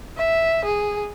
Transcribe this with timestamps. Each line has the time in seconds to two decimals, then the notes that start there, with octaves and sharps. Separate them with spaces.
0.17 E5
0.65 G#4